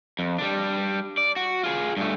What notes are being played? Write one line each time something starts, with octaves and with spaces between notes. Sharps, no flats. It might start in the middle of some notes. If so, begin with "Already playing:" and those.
F2
G3 D4
D5
F#4
F4 G#4
G2 A3